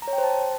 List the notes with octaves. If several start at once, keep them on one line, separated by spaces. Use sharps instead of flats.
A#5
C#5
G5
C5
A5